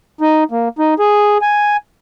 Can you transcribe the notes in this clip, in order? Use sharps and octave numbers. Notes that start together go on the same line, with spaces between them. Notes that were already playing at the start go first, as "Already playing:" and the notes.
D#4
A#3
D#4
G#4
G#5